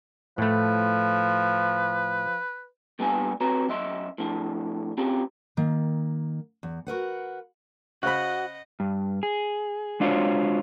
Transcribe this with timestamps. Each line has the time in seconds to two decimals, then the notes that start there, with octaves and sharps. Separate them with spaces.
0.38 A2 F3 A3 B4
2.99 A#2 G3 B3 D4 F4 G#5
3.41 C4 F#4 B4 C#5 A#5
3.69 F#2 D#5 E5 C6
4.18 A2 F3 D4
4.97 C4 C#4 F4 G4
5.57 D#3 A#3
6.63 E2
6.87 F#4 A#4 B4 F#5
8.03 C#3 F#4 C5 D#5 F#5 B5 F#6
8.80 G2
9.23 G#4
10.00 G#3 D4 F4 F#4 C5 C#5